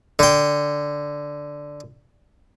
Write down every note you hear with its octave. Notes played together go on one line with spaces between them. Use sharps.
D3 G5